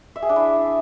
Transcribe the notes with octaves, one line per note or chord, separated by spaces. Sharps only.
E5
G#4
D4
E4